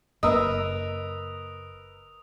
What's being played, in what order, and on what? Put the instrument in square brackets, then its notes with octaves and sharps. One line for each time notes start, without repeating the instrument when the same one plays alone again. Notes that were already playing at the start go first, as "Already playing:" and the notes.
[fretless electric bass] F#1 A#3 [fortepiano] A#4 B4 E6 [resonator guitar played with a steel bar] D#5 [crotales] D#6